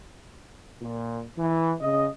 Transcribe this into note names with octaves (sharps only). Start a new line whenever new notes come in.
A#2
E3
C#3 D#5